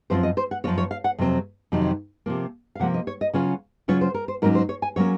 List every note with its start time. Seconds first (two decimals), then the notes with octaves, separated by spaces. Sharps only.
0.10 F#2 F3 C4 F4 C5
0.23 D#5
0.37 C5
0.51 F#5
0.64 F#2 F3 C4 F4 C#5
0.78 C#5
0.91 F5
1.04 F#5
1.18 F2 C3 F#3 C4
1.72 F2 C3 D#3 F#3 C4
2.26 C3 F3 A#3
2.75 F5
2.80 C3 F3 A#3 F#5
2.94 D#5
3.07 C#5
3.21 D#5
3.33 C#3 F#3 C#4 F4 C#5
3.88 C#3 F#3 C#4 F4 C#5
4.01 C5
4.14 A#4
4.28 C5
4.42 G#2 F#3 A#3 C#4 A#4
4.55 C5
4.69 C#5
4.82 G#5
4.96 F#3 A#3 C#4 C#5